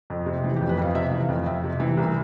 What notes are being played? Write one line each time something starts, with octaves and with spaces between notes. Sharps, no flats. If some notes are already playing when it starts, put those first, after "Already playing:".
F2
C3
E3
G4
F2
B4
F2 F5
C3 E5
E3
F5
F2
F2 E5
C3
E3
C2